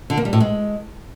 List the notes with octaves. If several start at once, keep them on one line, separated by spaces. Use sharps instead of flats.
D3
A#3
G3
A2
G#3